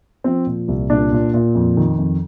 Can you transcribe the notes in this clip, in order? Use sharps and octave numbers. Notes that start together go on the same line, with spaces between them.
F3 C4
A#2
C2
A#2 D4
A#2
A#2
F2
D#3
F2